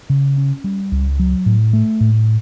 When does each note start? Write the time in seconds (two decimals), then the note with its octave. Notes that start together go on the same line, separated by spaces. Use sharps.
0.10 C#3
0.38 C#4
0.64 G3
0.92 C#2
1.19 F#3
1.46 A2
1.73 A3
2.01 A2